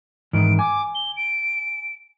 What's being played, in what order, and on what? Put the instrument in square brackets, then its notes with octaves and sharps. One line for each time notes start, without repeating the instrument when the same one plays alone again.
[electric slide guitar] G#2 D#3 E3 [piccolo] D7
[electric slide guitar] G#5 [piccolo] D6
[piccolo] G7
D7